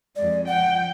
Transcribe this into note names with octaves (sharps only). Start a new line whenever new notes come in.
F2 G#3 D5
F3 F#5 G5